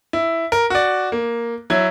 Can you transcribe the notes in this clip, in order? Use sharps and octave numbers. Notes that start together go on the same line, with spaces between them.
E4
A#4
F#4 D5
A#3
F#3 E4 G#6